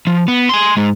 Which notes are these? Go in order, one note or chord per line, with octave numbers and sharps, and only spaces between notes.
F3
B3
G#5 C6
G#2 G#3